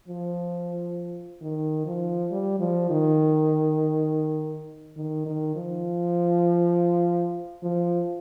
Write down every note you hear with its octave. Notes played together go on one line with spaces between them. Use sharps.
F3
D#3
F3
G3
F3
D#3
D#3
D#3
F3
F3